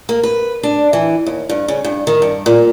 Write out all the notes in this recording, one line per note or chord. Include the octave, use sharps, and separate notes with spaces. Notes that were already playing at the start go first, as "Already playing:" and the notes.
A#3
B4
D4
E3
D#2
G2
C#3
G2
D#3
G2
A#2